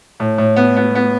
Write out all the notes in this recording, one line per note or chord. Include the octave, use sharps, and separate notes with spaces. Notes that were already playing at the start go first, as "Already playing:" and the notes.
A2
A2
B3
B3
B3